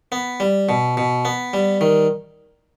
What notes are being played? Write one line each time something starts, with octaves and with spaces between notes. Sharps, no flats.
B3
G3
B2
B2
B3
G3
D#3